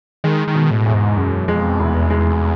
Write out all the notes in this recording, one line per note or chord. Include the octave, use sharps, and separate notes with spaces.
D#3 G#3
D#3
B2
A2
E2
G#2
F#2 G#3
F2 G#3
F1 E2
G#3